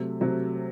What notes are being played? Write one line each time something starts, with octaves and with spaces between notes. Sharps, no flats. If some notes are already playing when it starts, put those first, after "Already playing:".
Already playing: C3 F#3 A3
C3 F#3 A3